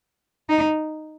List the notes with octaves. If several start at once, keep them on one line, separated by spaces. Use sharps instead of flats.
D#4